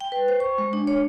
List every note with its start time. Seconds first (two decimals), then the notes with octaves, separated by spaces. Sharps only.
0.01 G5
0.12 B4
0.28 C5
0.40 C#6
0.58 G#3
0.73 D4
0.87 C#5